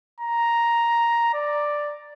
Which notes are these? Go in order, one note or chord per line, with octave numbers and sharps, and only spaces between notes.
A#5
D5